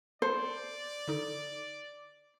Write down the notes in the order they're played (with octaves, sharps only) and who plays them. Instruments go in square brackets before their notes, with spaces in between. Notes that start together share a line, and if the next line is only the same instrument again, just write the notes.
[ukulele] C5 [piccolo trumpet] D5 [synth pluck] A5 C#7
[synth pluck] D3 D#4 A4